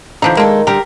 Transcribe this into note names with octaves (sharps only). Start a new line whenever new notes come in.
D3 E3 F3 D4 D#4
D#3 G#3 A#3 D4 A4
D3 G3 G4 A#4